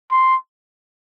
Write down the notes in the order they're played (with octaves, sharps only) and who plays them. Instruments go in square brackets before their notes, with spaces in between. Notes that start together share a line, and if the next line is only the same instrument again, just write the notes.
[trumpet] C6